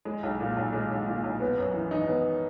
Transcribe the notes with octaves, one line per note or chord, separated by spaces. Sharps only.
G#3
B1
A#2
B1
G#3
B1
A#2
B1
B3
F#2
E3
D#4
B3